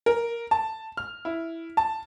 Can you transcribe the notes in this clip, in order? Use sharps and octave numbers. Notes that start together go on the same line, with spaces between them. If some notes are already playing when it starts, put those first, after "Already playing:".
A#4
A5
F6
E4
A5